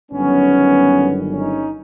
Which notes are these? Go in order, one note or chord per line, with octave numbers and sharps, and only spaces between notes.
G1 G2 D#3 F#3 B3 C#4
C#4 D#4